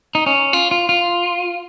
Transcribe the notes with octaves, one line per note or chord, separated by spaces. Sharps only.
D#4
C#4
F4
F4
F4